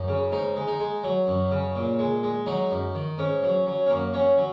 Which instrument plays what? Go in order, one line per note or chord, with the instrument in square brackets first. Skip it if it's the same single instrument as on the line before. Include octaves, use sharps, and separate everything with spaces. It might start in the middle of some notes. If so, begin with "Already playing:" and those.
Already playing: [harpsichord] F#2 D#4
C#3
G#2 D#4
G#3
D#4
G#3
F#3
F#2
C#3
A#2
G#3
G#3
F#3 D#4
F#2
D#3
G#2 C#4
F#3
F#3
C#4
F#2 A#3
F#3 C#4
F#3